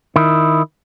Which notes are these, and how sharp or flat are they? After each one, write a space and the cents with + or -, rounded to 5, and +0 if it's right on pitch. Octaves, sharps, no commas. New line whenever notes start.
D#3 +0 E4 +0